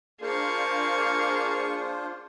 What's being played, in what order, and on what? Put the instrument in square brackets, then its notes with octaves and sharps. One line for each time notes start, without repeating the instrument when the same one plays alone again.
[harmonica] A#3 [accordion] D4 F4 C5 [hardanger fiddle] G#4 C#6